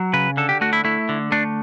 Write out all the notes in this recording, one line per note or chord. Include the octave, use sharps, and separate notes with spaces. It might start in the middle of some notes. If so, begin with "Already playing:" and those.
Already playing: F#3
C#3 B4
D3 A4
G4
A3 F#4
E4
A3 E4
D3
A3 D4